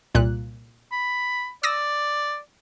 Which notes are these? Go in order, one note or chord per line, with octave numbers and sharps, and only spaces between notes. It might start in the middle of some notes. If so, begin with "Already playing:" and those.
C2 A#2 F#6
B5
D5 D#6 E6 A#6